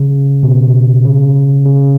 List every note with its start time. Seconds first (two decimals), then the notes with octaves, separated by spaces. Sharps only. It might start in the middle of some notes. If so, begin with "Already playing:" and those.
Already playing: C#3
0.43 B2
1.04 C#3
1.66 C#3